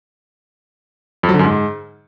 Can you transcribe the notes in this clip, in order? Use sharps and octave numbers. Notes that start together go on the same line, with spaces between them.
F2
F#3
D3
F#2
G#2